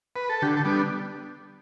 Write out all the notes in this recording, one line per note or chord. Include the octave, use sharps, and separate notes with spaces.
B4
A4
D3 G4
A4
G3 B3 D4